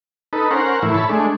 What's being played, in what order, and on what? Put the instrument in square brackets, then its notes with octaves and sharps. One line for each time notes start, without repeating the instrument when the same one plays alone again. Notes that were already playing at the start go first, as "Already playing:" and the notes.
[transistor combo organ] D#4 A4 B4
C#4 A#4 C5 F#5
A2 E3 E4
C#5 E5 A5 B5
G#3 A3 D4